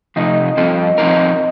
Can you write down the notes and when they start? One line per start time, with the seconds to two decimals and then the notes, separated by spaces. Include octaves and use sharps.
0.16 C3 F3 A3 D#4 D#5
0.57 G2 F3 C4 F4 A4
0.98 F3 C4 D#4 A#4